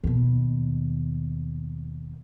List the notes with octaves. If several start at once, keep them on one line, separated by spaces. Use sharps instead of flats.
D#2 B2